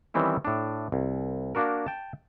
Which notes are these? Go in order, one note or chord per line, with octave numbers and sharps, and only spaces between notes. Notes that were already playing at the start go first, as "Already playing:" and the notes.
D#3 E3 G3 C4 C#4 E4
A2 D4
C2
A#3 D4 F#4 A#4
G5 A5